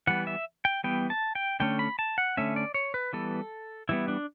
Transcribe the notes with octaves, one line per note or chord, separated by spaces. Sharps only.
E3 G3 B3 F#5
E5
G5
E3 G3 B3 G5
A5
G5
D3 A3 C#4 G5
B5
A5
F#5
D3 A3 C#4 E5
D5
C#5
B4
E3 G3 B3 A4
E3 G3 B3 E4
D4